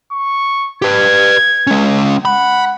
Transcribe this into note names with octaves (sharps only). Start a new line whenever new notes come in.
C#6
G4 B4 G#6
G#3 C#4
F#5 B5